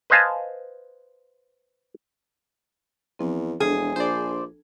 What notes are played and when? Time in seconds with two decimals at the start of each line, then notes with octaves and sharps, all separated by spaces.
0.10 B4 C5 D#5 F5 G#5 A5
3.19 E2 F3 C4
3.60 E1 D4 G#4
3.96 A#1 C5 D5